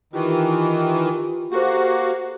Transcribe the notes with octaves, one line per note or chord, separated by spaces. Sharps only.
D#3 E3 F4 G4
A#3 F#4 G4 A4 C5